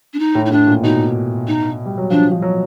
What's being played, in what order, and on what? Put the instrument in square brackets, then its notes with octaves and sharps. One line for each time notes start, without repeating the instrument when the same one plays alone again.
[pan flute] D4
D#4
[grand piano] A2
[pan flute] D#4
[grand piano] A2 [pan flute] D4
[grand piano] A#2
[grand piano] B2 [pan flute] D#4
[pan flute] D#4
[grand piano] G3
F#3
[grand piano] F3 [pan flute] D4
[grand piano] F3
F#3